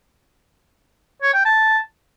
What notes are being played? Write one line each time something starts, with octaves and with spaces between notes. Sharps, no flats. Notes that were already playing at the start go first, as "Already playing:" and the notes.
C#5
G5
A5